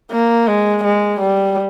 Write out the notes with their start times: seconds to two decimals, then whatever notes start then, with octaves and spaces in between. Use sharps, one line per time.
0.12 A#3
0.48 G#3
0.84 G#3
1.20 G3